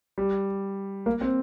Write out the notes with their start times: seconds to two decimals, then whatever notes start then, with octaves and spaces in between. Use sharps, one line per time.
0.18 G3
1.06 A#3
1.21 C4